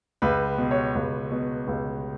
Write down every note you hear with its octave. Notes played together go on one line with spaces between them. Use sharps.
C#2 B4
B2
C#5
C#2
B2
C#2